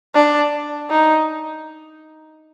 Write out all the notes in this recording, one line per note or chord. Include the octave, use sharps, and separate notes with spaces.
D4
D#4